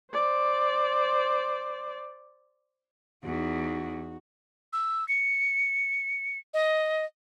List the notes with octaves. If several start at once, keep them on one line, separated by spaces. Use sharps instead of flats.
C5 D5
E2 D#4 F#4
E6
C#7
D#5